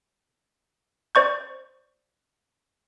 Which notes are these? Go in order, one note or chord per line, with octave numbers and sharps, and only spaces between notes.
C5 D5 C#6 G6